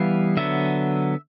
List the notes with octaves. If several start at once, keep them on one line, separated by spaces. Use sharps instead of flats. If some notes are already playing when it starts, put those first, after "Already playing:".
Already playing: E3 G3 B3 F5
D3 F#3 B3 E5